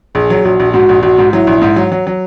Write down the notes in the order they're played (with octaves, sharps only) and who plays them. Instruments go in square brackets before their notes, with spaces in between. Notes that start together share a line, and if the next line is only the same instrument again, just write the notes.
[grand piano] A#1 [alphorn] G#4
[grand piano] F#3
[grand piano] A#1 [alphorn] F#4
[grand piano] A#1
[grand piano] G#2 [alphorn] F#4
[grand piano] A#1
[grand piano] A#1 [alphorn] F#4
[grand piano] G#2
[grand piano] F#3 [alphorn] E4
[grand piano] A#1
G#2
F#3
F#3
F#3